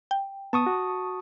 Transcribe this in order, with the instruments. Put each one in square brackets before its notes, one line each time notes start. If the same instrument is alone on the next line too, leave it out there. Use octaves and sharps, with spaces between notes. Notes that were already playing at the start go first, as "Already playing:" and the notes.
[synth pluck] G5
[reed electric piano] B3 [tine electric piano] A5 C#6 D#6
[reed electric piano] F#4